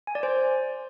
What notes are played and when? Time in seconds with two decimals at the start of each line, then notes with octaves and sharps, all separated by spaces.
0.07 G#5
0.15 D5
0.23 C5